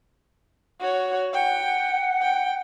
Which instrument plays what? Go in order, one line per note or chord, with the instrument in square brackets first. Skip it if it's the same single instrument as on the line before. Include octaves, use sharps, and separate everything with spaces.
[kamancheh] F#4 C#5
[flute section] F#5 [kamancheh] G5
[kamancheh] G5